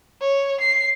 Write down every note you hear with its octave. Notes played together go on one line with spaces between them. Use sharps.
C#5
C7